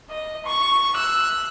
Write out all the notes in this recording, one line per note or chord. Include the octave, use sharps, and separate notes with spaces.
D#5
C#6
E6 F#6